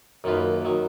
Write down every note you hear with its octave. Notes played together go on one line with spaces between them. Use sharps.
F#2 D#3 A#3 F4 B4
D#3 F#3